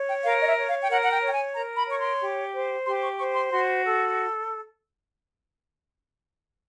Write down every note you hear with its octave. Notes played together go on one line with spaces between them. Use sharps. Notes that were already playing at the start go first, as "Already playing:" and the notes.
Already playing: C#5
G5
A#4 F5
D#5
E5
C#5
F5
G5
A#4 F#5
F#5
G5
C#5 G5
G#5
A#4 A#5
B5
C#5 C#6
C6
G4
C5
G4 C6
C#6
C5 C#6
C6
F#4 C6
A4